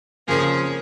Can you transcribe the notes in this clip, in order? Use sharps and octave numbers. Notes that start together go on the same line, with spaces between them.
F2 C#3 F3 A#3 G#4